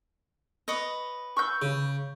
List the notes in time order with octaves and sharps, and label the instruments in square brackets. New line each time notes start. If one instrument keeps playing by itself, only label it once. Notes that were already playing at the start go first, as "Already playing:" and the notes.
[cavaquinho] B4 C#5 D#5
[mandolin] C#6 E6 G6
[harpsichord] C#3